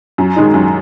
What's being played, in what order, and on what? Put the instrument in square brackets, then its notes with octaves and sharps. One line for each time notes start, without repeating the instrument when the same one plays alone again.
[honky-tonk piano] F#2
D#3 G#3 D#4
F#2